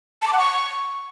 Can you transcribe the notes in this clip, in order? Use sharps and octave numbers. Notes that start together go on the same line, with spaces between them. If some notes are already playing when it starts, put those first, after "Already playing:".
A5
D6
F#5
C#6